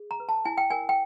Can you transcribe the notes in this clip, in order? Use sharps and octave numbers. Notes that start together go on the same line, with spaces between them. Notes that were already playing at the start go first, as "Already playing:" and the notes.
Already playing: G#4
A#5
B4
A5
E4 G#5
G5
A#4 G#5
G5